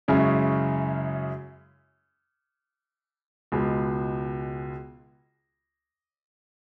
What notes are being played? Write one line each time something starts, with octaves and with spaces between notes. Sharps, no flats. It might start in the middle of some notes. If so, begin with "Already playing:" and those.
F#2 C#3 G#3 C#4 E4
C#2 B2 G#3